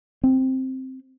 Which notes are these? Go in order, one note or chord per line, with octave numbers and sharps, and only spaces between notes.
C4